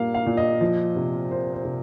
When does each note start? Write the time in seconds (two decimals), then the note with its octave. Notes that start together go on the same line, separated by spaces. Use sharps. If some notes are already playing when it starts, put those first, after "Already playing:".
Already playing: A#2 G3 A#3 F5
0.14 F5
0.26 A#2
0.37 D#5
0.61 F3
0.96 C3
1.30 A#3 C5
1.54 C5
1.65 C3